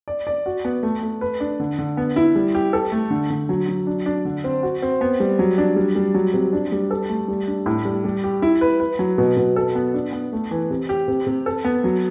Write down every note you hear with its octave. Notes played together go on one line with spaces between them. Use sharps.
D5
D5
F#4
B3
A3
A3
B4
D4
D3
D3
B3
E4
G3
G4
A4
A3
D3
D3
F#3
F#3
D4
D4
D3
C4
F#4
C4
B3
G3
F#3
D4
G3
G3
F#3
C3
D4
G3
A4
A3
G3
D4
A2
G3
G3
G4
E4
B4
B4
F#3
B2
B2
A4
B3
D4
B3
A3
E3
C3
G4
C3
C3
A4
B3
F#3